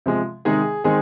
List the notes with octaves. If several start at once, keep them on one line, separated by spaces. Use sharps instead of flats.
C3 F3 G#3
C3 D#3 G#3 D#4 G#4
D#3 G#3 C4 D#4 G#4